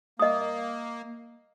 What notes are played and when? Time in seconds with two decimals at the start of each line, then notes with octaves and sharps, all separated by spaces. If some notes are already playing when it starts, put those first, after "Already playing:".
0.19 A#3 D#5 D#6